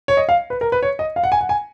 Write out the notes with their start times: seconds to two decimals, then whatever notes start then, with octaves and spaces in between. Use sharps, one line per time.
0.08 C#5
0.17 D#5
0.29 F5
0.50 B4
0.61 A#4
0.72 B4
0.83 C#5
0.99 D#5
1.16 F5
1.23 F#5
1.32 G#5
1.41 F#5
1.49 G#5